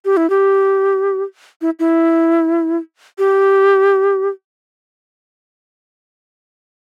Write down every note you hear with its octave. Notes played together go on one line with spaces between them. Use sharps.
G4
E4
G4
E4
E4
G4